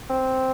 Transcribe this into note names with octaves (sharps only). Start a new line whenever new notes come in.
C4